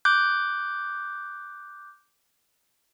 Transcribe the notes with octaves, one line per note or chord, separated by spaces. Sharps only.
D6 F#6 G6